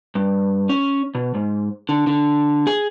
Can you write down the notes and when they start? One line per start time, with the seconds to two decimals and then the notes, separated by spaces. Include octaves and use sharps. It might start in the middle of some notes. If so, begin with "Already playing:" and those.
0.15 G2
0.69 C#4
1.15 B2
1.35 G#2
1.89 D3
2.07 D3
2.67 G#4